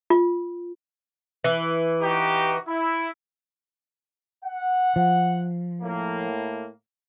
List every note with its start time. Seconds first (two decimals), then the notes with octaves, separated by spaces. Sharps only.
0.10 F4
1.44 E3
2.02 D#4 F#4 G4
2.68 E4
4.45 F#5
4.96 F3
5.82 A2 A#3